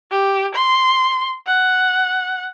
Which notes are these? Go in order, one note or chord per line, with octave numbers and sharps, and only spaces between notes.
G4
C6
F#5